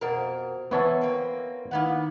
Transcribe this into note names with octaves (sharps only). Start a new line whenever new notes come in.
F2 B2 A#4 C5
E2 E3 B3 C#5 A5
A#3 C4
D#3 A#3 B3 D#4 E4 F#5